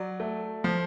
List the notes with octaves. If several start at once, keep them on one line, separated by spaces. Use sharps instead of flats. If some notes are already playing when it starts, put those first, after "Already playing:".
Already playing: F#3 D5
A3
F3